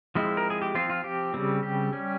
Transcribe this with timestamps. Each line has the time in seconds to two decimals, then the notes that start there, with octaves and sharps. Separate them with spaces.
0.15 F3 G#3 C4 E4
0.37 A#4
0.50 G#4
0.62 G4
0.75 F3 C4 F4
0.90 F4
1.04 G4
1.34 C#3 G3 C4
1.63 G4
1.93 G3 C#4